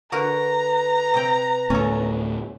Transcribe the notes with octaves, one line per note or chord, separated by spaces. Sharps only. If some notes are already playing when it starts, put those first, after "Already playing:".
D3 F#4 A#4 B4 A#5
C3 G5
D2 A2 B3 C#4 A4